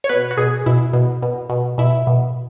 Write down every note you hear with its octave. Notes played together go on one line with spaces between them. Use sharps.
C#5
B2 B4
F#4
B2 G#4
B2 E4
B2
B2
B2
B2 E4
B2